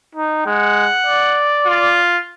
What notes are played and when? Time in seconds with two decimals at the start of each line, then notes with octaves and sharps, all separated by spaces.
0.15 D#4
0.46 G#3 F#5
1.06 D5
1.66 F4